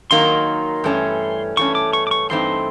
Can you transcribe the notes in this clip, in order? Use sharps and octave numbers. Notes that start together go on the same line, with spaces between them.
D#3 F#3 A#3 D#4 C6
G2 E3 A3 C#4
G2 E3 A3 C#4 C#6
D6
C#6
D6
C#6
G2 E3 A3 C4 D#4 C6